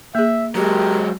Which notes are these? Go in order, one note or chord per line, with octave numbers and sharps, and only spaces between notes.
A#3 G#4 E5
F#3 G#3 G4 A#4